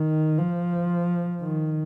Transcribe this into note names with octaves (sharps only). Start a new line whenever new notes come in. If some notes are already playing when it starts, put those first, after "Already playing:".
Already playing: D#3
F3
D#3